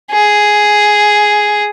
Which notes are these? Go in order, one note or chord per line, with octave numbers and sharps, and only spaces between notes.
G#4